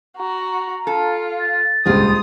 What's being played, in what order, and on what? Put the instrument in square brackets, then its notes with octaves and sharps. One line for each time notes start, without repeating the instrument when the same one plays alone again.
[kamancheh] F#4 [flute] A#5
[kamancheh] F4 [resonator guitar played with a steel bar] A4
[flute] A6
[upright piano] D#1 C#2 [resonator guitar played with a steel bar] C4 F4 [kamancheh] D#6